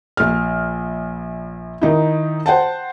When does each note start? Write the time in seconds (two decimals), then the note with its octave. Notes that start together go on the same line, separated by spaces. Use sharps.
0.17 A#1 F6
1.81 D#3 D#4 E4
2.46 C5 F#5 G5 A5